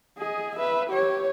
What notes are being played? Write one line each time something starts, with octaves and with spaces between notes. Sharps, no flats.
G#4 D#5
B4 E5
G4 C#5